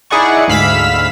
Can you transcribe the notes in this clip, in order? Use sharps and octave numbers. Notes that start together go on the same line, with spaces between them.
D#4 E4 G#4 D5 F#5 C#6
D2 G#2 F5 B5 E6 B6